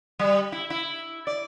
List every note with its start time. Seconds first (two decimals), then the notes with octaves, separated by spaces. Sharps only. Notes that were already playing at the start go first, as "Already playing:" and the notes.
0.19 G3
0.52 E4
0.70 E4
1.27 D5